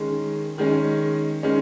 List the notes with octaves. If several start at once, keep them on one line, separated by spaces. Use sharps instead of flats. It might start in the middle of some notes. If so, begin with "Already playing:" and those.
Already playing: D#3 G#3 C#4
D#3 G#3 C#4
D#3 G#3 C#4